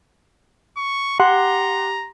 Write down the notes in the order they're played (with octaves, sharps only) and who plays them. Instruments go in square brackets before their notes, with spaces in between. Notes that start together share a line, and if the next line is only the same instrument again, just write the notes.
[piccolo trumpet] C#6
[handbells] G4 C6 [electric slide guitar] F#5 [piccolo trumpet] A#5